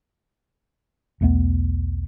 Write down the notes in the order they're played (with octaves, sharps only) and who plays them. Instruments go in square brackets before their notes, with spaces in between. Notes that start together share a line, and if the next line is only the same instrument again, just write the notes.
[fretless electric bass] B1 E2 A3 B3